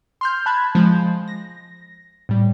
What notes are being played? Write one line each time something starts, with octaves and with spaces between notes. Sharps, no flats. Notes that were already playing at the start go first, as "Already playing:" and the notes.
C6 F6 G6
A5 B5 F#6 G#6
F3 G#3 G6
A#6
A2 G3